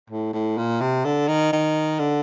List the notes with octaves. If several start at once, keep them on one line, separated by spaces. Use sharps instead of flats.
A2
A2
A#2
C3
D3
D#3
D#3
D3